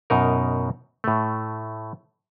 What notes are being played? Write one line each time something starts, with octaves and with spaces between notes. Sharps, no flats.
F#2 B2 D#4 A#4
A2 A3